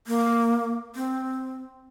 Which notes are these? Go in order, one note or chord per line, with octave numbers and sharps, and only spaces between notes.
A#3
C4